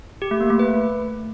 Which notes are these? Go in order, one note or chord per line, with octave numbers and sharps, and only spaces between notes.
G4
A3
A#3
A3
B4